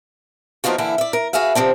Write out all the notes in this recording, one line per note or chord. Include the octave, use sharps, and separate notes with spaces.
F3 A#3 B3 D#4 F4 F#4
D3 E3 A#3 E4
D5 E5
A#4
F#4 G#4 B4 E5 F5
C3 F3 C4 D4